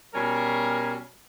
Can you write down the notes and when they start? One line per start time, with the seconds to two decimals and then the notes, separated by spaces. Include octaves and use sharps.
0.14 B2 G3 C#4 A#4